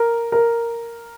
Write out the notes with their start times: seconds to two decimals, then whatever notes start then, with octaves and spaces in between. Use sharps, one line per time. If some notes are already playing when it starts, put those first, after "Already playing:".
Already playing: A#4
0.32 A#4